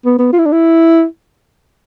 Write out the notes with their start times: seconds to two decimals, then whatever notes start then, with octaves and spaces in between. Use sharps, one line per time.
0.05 B3
0.19 B3
0.32 F4
0.39 E4
0.46 D4
0.52 E4